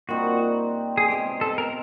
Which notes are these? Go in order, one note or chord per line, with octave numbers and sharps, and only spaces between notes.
A#2 G3 C4 D#4 F#4
G#4
B2 G#3 C4 G4
A4
A#4